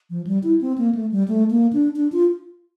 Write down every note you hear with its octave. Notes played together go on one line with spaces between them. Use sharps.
F3
G3
E4
C4
A#3
A3
G3
A3
A#3
D4
D4
F4